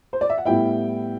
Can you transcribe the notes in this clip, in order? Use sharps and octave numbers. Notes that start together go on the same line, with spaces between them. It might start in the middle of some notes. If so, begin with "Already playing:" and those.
C5
D5
E5
F#5
A2 G3 B3 E4 G5